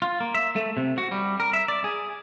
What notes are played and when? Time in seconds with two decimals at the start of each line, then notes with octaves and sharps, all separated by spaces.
0.02 F4
0.20 A#3
0.35 E5
0.56 A3
0.77 C3
0.98 F#4
1.11 G3
1.40 A#4
1.53 E5
1.68 D5
1.84 G#4